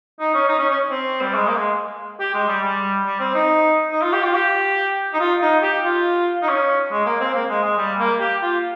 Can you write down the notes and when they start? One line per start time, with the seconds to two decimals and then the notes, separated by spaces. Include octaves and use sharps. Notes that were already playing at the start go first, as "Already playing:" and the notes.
0.20 D#4
0.34 C#4
0.49 D#4
0.59 C#4
0.70 C#4
0.91 C4
1.21 G3
1.34 G#3
1.47 A#3
1.56 G#3
2.20 G4
2.34 G#3
2.48 G3
2.63 G3
3.06 G3
3.20 C4
3.34 D#4
3.91 D#4
4.02 F4
4.13 G4
4.24 F4
4.34 G4
5.14 D#4
5.20 F4
5.42 D#4
5.63 G4
5.84 F4
6.42 D#4
6.49 C#4
6.92 G#3
7.06 A#3
7.21 C4
7.34 A#3
7.49 G#3
7.63 G#3
7.78 G3
7.99 A#3
8.20 G4
8.42 F4